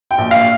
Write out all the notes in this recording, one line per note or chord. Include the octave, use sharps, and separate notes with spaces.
G5
A#1
F5